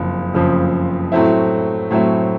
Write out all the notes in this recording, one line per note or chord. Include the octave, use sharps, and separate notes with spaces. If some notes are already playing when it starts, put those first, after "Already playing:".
Already playing: F#1 F2 C#3 F3
F#1 F2 C#3 F3
A2 F#3 A3 C4 E4
A2 F#3 A3 C4 E4